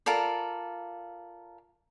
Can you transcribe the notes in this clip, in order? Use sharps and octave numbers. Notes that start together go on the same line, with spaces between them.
F4 A4 A#4 D5